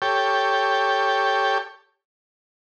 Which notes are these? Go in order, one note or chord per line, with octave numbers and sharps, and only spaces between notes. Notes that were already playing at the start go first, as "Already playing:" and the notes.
G4 A4 C#5 G5